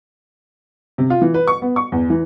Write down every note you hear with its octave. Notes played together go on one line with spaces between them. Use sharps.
C3
F4
E3
B4
C#6
B3
C#6
E2
E3